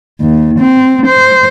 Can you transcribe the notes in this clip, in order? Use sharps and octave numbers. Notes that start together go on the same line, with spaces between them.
D#2
C4
C5